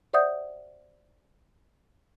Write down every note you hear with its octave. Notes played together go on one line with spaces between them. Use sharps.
C5 D5 E5 F#5 D#6 G6